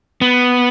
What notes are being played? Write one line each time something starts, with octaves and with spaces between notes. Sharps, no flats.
B3